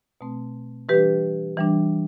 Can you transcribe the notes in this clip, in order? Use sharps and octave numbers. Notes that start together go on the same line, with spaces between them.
B2 A3 C4
E3 G3 D4 G4 B4
E3 G3 D4